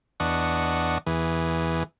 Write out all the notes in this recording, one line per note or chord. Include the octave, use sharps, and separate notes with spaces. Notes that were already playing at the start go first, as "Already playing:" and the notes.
E2 D4 D#5 F#5 C#6
E2 E3 G#4